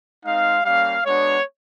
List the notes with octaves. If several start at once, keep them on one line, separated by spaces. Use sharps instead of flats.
G#3 C4 D#4 F5
G3 A#3 C#4 F5
G#3 B3 D4 F#4 C#5